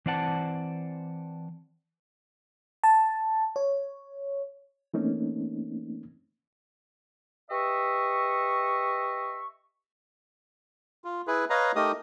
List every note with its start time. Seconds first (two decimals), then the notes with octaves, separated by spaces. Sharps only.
0.06 E3 C4 C5 D5 F#5 A5
2.84 A5
3.56 C#5
4.94 E3 A3 A#3 C4 C#4 D#4
7.50 G4 B4 D#5 E5 C#6
11.04 F4
11.27 E4 G#4 B4
11.50 B4 C#5 D#5 F5 A#5
11.76 A3 D#4 G4 A#4 D#5 D#6